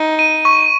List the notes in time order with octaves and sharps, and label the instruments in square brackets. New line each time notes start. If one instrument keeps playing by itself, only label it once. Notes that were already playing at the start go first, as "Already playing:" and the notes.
Already playing: [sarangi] D#4
[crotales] D#7
C#6